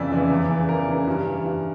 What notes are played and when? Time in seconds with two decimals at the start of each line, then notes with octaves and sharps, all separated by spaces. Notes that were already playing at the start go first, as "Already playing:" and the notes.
Already playing: F2 C#3 E3 D5 E5
0.12 C#3 E3
0.30 E2
0.50 C#3 E3
0.69 E2 A#4
0.88 C#3 E3
1.07 G2
1.26 E3
1.45 G2